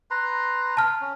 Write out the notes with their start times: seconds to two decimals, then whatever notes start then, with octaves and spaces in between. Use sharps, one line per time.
0.11 B4 A#5 C6
0.77 A5 F6
1.01 C#4